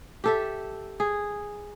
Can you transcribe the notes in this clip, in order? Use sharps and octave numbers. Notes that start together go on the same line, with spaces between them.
G4 A4 E5
G#4